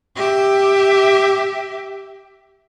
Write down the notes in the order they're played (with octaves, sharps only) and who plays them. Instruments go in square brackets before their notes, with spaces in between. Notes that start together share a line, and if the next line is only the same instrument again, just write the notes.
[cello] G4 E5